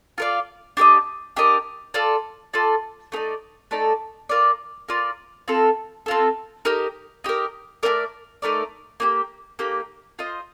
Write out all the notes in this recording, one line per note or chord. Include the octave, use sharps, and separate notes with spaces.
F4 A#4 D5 F5
D4 G4 A#4 D#5
D4 G4 A#4 D#5
F4 A4 D5
F4 A4 D5
A3 D#4 A4 D5
A3 D#4 A4 D5
F4 A#4 D5
F4 A#4 D5
C4 F4 A4
C4 F4 A4
D#4 G4 A#4
D#4 G4 A#4
A3 D#4 A#4 D5
A3 D#4 A#4 D5
A#3 D#4 G4
A#3 D#4 G4
F4 C5 D#5